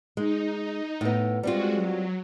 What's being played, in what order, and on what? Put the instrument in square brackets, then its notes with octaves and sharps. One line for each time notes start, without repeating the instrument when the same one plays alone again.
[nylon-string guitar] G#3 [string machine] D#4
[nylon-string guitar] A2 B3
[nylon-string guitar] G3 C4 F4 [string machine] G#3 F#4
[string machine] F#3